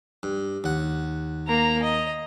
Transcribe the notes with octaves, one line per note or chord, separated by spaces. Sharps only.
G2
D#2 F#5
A#3 A#5
D#5